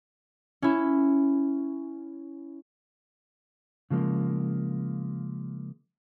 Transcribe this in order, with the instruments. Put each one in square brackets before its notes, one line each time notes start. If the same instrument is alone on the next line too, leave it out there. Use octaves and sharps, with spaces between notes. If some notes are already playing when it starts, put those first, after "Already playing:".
[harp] C#4 E4
[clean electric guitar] C#3 F3 G#3 A#3